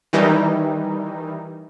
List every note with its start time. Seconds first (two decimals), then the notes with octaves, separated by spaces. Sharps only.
0.13 D#3 E3 G3 D#4